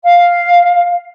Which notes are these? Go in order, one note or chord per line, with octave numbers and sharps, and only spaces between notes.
F5